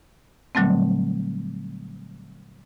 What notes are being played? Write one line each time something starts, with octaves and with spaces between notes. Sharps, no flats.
A#2 D3 F#3 G3 A3 C4